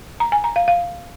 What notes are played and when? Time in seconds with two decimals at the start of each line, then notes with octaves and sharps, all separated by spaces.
0.20 A#5
0.32 G#5
0.44 A#5
0.56 F5
0.68 F5